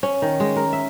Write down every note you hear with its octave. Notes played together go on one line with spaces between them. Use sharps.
C#4
D#3
G#3
A#4
E5